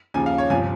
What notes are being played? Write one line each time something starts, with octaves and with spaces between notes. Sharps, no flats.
D#2 C#3 F3 G#5
F5
C#5
G1 C3 F3 G#5